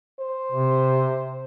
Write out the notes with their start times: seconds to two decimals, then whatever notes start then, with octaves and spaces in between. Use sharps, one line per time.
0.20 C5
0.52 C3